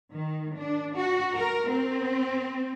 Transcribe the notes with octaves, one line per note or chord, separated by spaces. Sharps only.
D#3
D4
F#4
A#4
C4